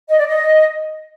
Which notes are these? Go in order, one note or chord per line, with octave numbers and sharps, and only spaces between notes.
D#5
D5
D#5